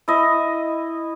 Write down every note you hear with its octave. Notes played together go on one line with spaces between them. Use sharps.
E4 D#5